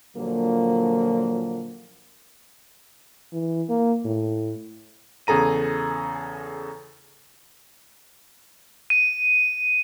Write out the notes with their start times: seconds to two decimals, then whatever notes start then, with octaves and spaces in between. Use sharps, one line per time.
0.17 A#2 D3 F3 F#3 A#3
3.33 E3
3.69 A#3
4.05 A2
5.27 E2 C#3 G#4 A4 A#5 D#7
8.90 D#7